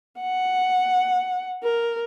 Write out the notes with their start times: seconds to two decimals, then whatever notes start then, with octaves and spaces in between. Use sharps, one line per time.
0.20 F#5
1.63 A#4